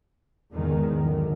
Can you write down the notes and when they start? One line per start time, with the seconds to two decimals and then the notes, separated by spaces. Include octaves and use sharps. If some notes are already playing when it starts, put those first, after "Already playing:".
0.51 E2 G#2 D#3 G#3
1.01 B1 F#2 D3 D#3